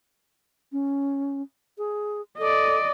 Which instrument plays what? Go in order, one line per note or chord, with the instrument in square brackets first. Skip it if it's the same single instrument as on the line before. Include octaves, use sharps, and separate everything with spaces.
[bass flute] C#4
G#4
[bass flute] A4 [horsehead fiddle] D5 D#5